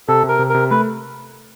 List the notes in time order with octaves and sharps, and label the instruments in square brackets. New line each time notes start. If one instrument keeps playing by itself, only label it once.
[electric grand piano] C3 [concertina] A4
[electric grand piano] C3 [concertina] A#4
[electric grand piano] C3
[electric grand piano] C3 [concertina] A#4
[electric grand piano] A3 [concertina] B4